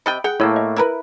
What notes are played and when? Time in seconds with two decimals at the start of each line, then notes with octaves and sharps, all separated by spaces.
0.06 C3 D#5 G5 B5 A6
0.24 G#4 F#5 G5 F#6
0.40 A2 A3 A#3 E4 C#5 E6
0.56 D#5
0.76 E4 A#4 B4